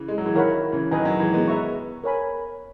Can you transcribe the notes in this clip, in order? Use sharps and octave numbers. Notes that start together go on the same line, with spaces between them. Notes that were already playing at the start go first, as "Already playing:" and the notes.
Already playing: C#3 E3
G#3
F#3
E3
D#3 E4 A#4 C#5 F#5 B5
C#3 E3
D#3 F#3 B4 D#5 G#5
D#3 F#3
E3 G#3
G#3 B3
B4 E5 A#5 C#6
A#4 C#5 G#5 B5